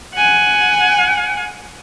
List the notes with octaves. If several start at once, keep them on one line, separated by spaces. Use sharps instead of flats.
F#5 G#5